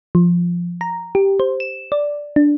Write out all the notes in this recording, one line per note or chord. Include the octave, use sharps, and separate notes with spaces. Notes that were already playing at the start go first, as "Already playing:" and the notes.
F3
A#5
G4
C5
E7
D5
D4